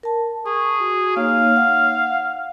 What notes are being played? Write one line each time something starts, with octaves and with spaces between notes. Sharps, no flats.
A#4 A5
G#4 C#6
F#4
A#3 D#4 C#5 F5
F#5